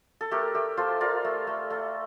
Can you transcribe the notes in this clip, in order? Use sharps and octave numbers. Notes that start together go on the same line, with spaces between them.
A4
A3 G4 A#4
A3 G4
F4 A4 C5
F4 A#4 D5
A3
A3
A3